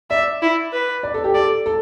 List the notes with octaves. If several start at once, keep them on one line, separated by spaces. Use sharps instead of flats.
D5 E5
E4
B4
D5
A4
G4
A4 D5
A4